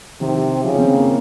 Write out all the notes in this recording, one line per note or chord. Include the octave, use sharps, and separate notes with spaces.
C3 D#3
C#3 F3
C#4
C4
A#3